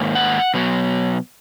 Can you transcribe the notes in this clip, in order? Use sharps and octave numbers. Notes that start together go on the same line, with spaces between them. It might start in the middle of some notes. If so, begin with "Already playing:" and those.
Already playing: G#2 D#3 A#3
F#5
B2 F#3 B3